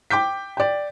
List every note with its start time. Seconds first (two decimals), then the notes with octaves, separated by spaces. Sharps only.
0.10 G5 D6 G6 B6
0.57 D5 G5